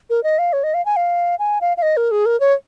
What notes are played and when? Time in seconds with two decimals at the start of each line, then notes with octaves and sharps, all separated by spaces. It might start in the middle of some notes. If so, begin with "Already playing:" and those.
0.10 A#4
0.24 D#5
0.39 F5
0.53 C#5
0.64 D#5
0.74 F5
0.86 G#5
0.96 F5
1.39 G#5
1.61 F5
1.77 F5
1.82 D#5
1.97 A#4
2.11 G#4
2.26 A#4
2.40 C#5